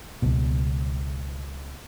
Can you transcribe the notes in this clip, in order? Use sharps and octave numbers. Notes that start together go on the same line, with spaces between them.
C#2 B2